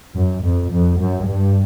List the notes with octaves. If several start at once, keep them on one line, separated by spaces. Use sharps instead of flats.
F#2
F2
F2
F#2
G2